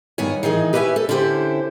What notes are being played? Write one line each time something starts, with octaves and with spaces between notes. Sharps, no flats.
G2 D#3 B3 C#5 G#5
D#3 E3 D#4 G#4
G4 B4 C#5 D#5 E5 G#5
A4
D3 C#4 E4 G4 A#4 C5